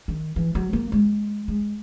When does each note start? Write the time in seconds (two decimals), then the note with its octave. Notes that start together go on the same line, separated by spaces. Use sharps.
0.08 D#3
0.36 E3
0.55 F#3
0.73 A#3
0.92 G#3
1.48 G#3